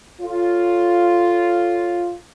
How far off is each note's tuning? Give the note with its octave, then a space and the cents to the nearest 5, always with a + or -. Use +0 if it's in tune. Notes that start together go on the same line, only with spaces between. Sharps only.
F4 +0 A4 +0 C#5 +0